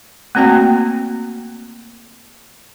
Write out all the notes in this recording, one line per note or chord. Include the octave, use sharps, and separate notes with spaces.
A3 A#3 C4 F#4 G5